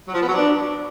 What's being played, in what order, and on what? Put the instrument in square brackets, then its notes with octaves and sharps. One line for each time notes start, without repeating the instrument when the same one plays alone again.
[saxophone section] F#3
F3
B3
F#3
D4